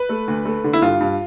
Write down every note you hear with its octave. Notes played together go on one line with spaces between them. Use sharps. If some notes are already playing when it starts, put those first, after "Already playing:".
Already playing: B4
A3
D2
A3
D3
E4
G2 F4
G2